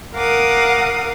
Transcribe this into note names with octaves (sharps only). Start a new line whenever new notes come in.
A#4 F5 F#5 D6 D#6